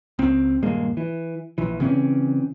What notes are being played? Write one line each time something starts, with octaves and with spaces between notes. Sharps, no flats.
C#2 C4
D#1 G2 G#3 A#3
E3
A#1 E3
C#3 E3 C4 C#4